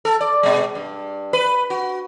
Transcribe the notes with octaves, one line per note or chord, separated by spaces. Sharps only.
A4
D5
B2 G#3
G2
B4
F#4